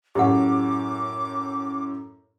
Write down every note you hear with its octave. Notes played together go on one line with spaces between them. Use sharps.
F#2 A2 G4 F#5 D6